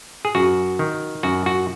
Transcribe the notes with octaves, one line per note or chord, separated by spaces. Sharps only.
G#4
F#2 F#4
D#3
F#2 F#4
F#4